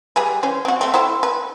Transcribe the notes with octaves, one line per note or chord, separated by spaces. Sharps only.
G3 G#4 B4
E3 C#4 C5
C4 F#4
A3 C4
E4 A4 C5
B4